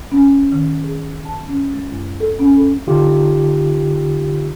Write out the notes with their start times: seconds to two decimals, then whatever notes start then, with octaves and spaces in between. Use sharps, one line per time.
0.12 C#4
0.52 D#3
0.84 G#4
1.25 A5
1.47 C#4
1.74 G#3
1.90 F#2
2.20 A4
2.39 C#4
2.57 A4
2.87 D3 D#4 F4 G4